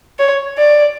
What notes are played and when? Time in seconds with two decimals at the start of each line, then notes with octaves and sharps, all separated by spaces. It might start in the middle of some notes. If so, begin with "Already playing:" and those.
0.19 C#5
0.59 D5